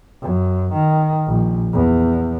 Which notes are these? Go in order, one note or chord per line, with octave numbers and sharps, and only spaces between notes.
F#2
D#3
A#1
E2